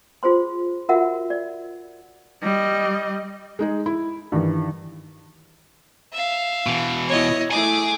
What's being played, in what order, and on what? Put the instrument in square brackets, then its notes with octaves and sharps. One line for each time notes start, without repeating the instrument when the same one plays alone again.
[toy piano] F4 G#4 C5 C6
F4 F#4 A#4 E5 F#5
D5
[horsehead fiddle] G3 D#5
[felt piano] G#3 D#4 G#4
E4
G2 D#3 E3
[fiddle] E5 F5
[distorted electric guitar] B2 E3
[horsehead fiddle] B3 E4 [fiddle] C#5 D#5
[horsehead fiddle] A3 E4 [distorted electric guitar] G#4 G#5 [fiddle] D6